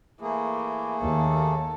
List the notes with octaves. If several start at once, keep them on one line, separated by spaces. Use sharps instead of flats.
E3 A3 A#3 G#4
D#2 A4